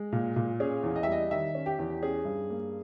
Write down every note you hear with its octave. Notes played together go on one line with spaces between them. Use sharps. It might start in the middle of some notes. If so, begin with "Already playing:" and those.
Already playing: G#3
A#2
A#2
C#4 G#4
E2
D#5
E5
G3 D#5
D#3 E5
C#4
G4
E2
C#4 G#4
G2
A#3